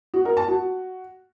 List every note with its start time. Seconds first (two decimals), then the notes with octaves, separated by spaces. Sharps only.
0.14 F#4
0.25 A#4
0.37 A5
0.48 F#4